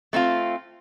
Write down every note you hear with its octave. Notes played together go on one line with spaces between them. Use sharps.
A3 C4 E4 F4